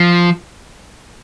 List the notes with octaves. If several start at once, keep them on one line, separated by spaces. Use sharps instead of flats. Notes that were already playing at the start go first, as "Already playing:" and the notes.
Already playing: F3